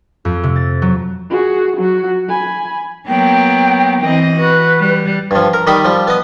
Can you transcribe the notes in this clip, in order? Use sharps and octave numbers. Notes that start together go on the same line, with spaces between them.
F2
C3
A6
F#3
F#4 G#4
F#3 F#4
G#5 B5
F#3 A#3 B3 G5
E3 C4 D#5
F#4 B4
G3
G2 F3
A#4
D#3 G3 D#5 B5
F3 G3
B3 D#5